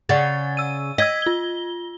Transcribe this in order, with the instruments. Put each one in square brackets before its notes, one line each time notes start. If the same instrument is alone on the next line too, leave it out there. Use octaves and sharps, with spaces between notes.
[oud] C#3 [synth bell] D5 F#5 A6
[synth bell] E6 D#7
[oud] D#5 [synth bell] E6 G#6 B6
[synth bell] F4 G7